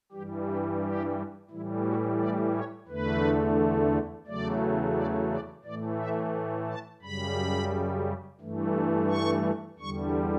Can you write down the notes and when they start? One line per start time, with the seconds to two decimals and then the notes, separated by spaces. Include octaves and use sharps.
0.12 G2 E3 G3 G4
0.47 G4
0.82 G4
1.50 A2 E3 G3 E4
1.84 F#4
2.19 D5
2.54 C#5
2.88 E2 D3 A3 B4
4.27 E2 C#3 F#3 A3 D5
4.96 D5
5.30 D5
5.64 A2 E3 A3 D5
5.98 E5
6.68 A5
7.02 F#2 C#3 G3 B5
8.41 G2 E3 A3
9.09 C#6
9.78 E2 D3 G3 C#6